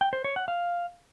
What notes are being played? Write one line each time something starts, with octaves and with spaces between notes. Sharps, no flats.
G5
C5
C#5
F#5
F5